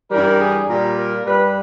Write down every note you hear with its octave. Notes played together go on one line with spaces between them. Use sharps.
G2 E3 G3 A#4
G#4
A#2 G3 A#4
A#4
G2 G3 B4